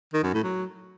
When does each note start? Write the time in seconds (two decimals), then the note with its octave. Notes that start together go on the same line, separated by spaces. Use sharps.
0.13 D#3
0.23 F#2
0.34 A2
0.44 F#3